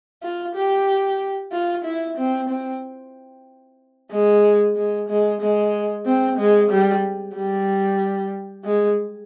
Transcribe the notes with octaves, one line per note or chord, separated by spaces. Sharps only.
F4
G4
F4
E4
C4
C4
G#3
G#3
G#3
G#3
C4
G#3
G3
G3
G#3